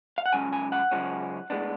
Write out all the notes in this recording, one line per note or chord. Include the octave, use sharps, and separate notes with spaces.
F5
F#5
F#2 C#3 F3 G#3 C#4 G#5
G#5
F#5
F#2 C#3 F3 G#3 C#4
A2 G#3 B3 D4